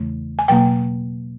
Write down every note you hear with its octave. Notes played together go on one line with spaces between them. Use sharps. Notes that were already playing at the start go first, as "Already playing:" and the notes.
Already playing: E2 C#3 E3 A3
G#5
B2 F#3 A#3 G5